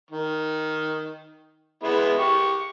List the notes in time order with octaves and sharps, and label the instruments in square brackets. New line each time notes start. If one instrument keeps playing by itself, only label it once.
[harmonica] D#3
G#3 B3 E4
G4 C#6